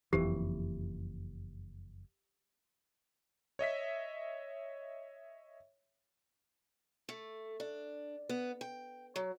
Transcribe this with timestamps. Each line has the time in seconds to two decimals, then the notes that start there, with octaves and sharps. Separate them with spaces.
0.13 F#1 F2 E3 G4
3.59 C#5 D#5 E5 B6
7.09 A3
7.60 D4
8.29 B3
8.61 G5
9.16 F#3